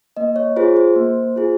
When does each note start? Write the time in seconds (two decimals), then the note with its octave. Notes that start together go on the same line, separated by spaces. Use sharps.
0.17 A#3 D#5
0.36 C#5
0.56 F4 G#4 C5
0.76 C5
0.96 A#3
1.36 F4 G#4